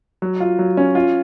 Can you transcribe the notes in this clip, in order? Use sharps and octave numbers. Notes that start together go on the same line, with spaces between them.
F#3
F4
F#3
C#4
F4